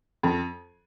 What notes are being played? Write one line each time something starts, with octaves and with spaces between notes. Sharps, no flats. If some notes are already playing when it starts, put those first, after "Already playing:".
F2